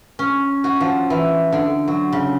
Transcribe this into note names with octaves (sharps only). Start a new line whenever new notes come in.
C#4
F#4
F3
E3
D3
F#3
C#3